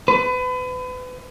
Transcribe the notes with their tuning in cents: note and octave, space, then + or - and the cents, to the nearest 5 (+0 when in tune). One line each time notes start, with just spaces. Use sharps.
B4 +35